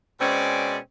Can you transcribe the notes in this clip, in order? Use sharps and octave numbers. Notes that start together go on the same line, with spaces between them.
B2 G#3 C4 C#4 D5